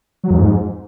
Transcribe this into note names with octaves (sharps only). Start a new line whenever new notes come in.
F#3
F2
G#2